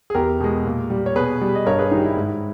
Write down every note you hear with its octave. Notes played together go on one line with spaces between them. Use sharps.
G#4
E2 G4 A#4
B2 G#3
A#2
G3
C#5
B2 G#4 B4
G3
D#5
G2 A#4 C#5
G#4 B4
D#3 G3 D#4
E4
G#2